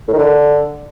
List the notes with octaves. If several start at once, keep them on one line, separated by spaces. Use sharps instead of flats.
A2
D#3
D3